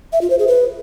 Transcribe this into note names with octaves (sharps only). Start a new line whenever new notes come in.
E5
F4
C5
G#4
B4